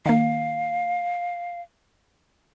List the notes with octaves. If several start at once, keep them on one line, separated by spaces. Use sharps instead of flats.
D#3 A#3 F5